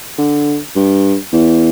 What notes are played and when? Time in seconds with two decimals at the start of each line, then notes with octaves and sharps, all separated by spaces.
0.18 D3
0.75 G2
1.32 E2